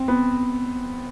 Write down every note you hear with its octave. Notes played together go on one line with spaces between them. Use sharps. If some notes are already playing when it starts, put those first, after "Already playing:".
Already playing: C4
B3